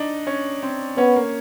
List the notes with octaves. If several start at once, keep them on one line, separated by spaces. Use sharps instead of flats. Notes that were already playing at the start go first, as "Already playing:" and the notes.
Already playing: D4 D#4
C#4
C4
B3 C#4
A#3